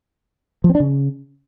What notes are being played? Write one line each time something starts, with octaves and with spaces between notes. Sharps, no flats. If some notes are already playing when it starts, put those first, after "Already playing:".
F3
C4
D4
C#3